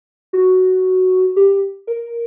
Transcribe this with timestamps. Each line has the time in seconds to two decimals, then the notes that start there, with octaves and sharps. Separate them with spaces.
0.33 F#4
1.36 G4
1.87 A#4